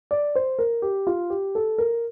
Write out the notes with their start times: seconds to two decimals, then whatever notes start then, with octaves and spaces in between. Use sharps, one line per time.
0.11 D5
0.35 C5
0.59 A#4
0.82 G4
1.07 F4
1.30 G4
1.55 A4
1.78 A#4